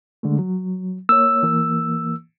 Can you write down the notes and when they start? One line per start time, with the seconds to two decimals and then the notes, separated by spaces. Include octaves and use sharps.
0.23 D3 G#3 A3
0.39 F#3
1.09 A#3 C#5 E6
1.43 E3 A#3